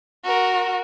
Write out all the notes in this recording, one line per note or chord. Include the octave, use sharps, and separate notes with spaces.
F#4 A#4